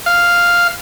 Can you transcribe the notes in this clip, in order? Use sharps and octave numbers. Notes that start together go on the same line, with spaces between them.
F5